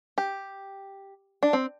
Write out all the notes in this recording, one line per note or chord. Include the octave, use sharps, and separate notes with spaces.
G4
D4
C4